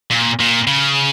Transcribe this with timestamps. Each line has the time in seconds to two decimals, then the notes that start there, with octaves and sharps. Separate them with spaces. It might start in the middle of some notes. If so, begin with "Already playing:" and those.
0.11 A#2
0.40 A#2
0.67 C#3